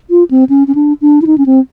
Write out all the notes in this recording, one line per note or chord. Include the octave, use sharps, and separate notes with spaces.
F4
C4
C#4
C#4
D4
D4
E4
D#4
C#4
C4